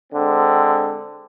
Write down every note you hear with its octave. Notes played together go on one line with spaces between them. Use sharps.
D3 G#3 C4